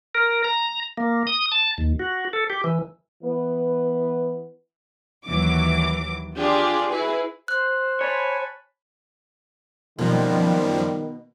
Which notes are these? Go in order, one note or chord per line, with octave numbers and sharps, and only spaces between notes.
A#4
A#5
A#3
D#6
A5
D#2
F#4
A4
G4
E3
E3 B3 B4
D#2 E3 F#3 D6
D4 F4 G4 G#4
E4 F#4 G#4 B4
C5 F#6
C#5 G#5 A5 B5
F#2 B2 D#3 F3 G3 A#3